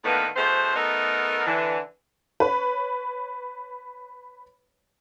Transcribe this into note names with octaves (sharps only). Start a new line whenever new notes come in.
A2 D3 D#3 A#3 B3 B4
E2 B2 A3 C5
A3 B3 D#4 A4 A#4
D3 E3
B4 C#5